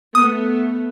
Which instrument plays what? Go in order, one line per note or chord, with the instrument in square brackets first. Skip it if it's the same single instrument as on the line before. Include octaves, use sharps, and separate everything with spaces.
[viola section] A3 B3 [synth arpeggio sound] D#6